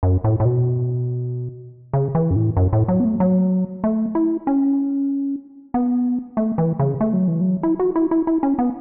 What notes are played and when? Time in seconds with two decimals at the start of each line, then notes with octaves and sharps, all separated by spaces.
0.03 F#2
0.24 A2
0.40 A2
0.45 B2
1.93 C#3
2.15 E3
2.31 F#2
2.36 A2
2.57 F#2
2.73 A2
2.88 F#3
3.00 B3
3.05 A3
3.20 F#3
3.84 A3
4.15 E4
4.47 C#4
5.74 B3
6.37 A3
6.58 E3
6.79 C#3
7.01 A3
7.13 F#3
7.28 E3
7.41 F#3
7.63 E4
7.79 F#4
7.96 E4
8.11 E4
8.27 E4
8.43 C#4
8.59 B3